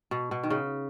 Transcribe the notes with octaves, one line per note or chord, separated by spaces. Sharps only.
B2
B2
D#3
C#3